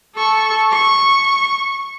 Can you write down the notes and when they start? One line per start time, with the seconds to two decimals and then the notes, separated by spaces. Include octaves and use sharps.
0.15 A4 C#6
0.72 C#6